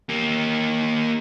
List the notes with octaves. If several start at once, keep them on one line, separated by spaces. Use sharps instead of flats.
A#3 G4